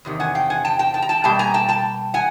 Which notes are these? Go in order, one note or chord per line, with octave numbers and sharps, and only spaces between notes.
E2 C3 D#3
F#5 G#5
F5 G5
F#5 G#5
G5 A5
G5 A5
G5 A5
A#5
G5 A5
B2 G3 A#3 G5 A5
G#5 A#5
G5 A5
G5 A5
F#5 G#5